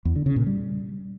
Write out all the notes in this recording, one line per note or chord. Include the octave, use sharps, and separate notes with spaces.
E2
D3
C#3
A#2
G3